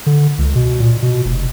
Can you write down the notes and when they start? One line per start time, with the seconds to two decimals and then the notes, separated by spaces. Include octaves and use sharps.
0.06 D3
0.38 C#2
0.55 B2
0.80 A#2
1.02 B2
1.25 F1